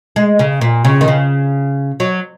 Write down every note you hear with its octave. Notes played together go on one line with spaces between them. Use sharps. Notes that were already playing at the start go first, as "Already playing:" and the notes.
G#3
C#3
A#2
C#3
D#3
C#3
F#3